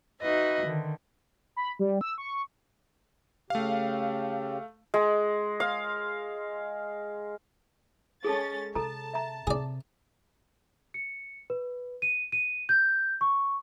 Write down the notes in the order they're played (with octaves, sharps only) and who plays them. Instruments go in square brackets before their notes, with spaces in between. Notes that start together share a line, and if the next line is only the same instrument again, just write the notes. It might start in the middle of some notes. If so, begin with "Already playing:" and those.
[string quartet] D#4 F#4 B4 D#5 E5
D3 D#3
[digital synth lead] B5
G3
E6
C#6
[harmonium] C#3 G4 [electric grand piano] A3 F5
[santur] G#3
F5
[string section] G#3 C#4 A6 [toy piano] G#4 A4 A5
[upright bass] C3 [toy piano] A4 A#5 [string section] A5
[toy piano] E5 A#5
[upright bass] C3 [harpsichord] G#4 D5
[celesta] C#7
B4
D#7
D#7
G6
C#6